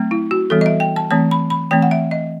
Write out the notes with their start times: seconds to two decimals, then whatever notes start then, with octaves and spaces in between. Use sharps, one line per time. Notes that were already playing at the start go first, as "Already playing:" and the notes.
Already playing: F#3 A3 C4
0.11 E4
0.31 F#4
0.50 E3 G3 B3 A4
0.61 D#5
0.66 E5
0.80 G5
0.96 A5
1.11 E3 A3 C4 A5
1.31 B5
1.50 B5
1.71 E3 A3 C4 G5
1.82 F#5
1.91 E5
2.11 D#5